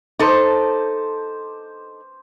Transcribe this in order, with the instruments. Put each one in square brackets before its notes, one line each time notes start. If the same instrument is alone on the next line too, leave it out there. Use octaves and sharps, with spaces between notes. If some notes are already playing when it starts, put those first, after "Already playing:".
[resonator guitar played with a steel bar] D#4 A4 [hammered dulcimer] C5 D6